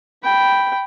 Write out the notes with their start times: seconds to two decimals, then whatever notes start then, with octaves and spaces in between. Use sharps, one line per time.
0.24 G5 B5